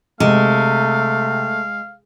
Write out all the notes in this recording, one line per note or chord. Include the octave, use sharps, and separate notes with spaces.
C3 G#3 A3 F5